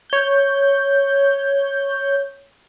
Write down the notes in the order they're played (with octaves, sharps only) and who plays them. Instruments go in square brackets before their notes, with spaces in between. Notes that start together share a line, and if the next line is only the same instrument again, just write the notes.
[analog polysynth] C#5 G6